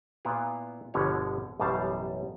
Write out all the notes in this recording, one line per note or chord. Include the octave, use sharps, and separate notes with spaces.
A#2 B3 E4 F4
G1 B2 D3 F3 B4 C#5
A1 F#2 B2 G3 F5 A5